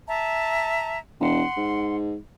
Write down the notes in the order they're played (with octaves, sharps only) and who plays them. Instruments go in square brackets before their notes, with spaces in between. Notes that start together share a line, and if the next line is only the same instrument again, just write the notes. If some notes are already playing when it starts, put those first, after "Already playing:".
[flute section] E5 A5 A#5
[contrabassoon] E1 [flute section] F#5 C6
[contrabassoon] G#2